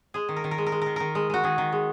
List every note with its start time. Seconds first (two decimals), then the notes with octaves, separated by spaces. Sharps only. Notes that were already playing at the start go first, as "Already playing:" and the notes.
0.14 G#3 G#4
0.29 D#3
0.36 A#4
0.44 D#3
0.51 A#4
0.58 G#3
0.66 A#4
0.72 G#3
0.82 D#3 A#4
0.96 D#3 A#4
1.15 G#3
1.30 G#3 F#4
1.43 D#3 G#4
1.58 D#3
1.72 G#3